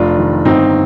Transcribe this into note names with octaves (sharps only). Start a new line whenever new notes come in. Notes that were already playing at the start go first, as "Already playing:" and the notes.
Already playing: F1 D4 F4
D#3
G1 C4 D#4